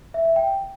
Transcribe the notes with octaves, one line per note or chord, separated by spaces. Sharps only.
E5
E5
G5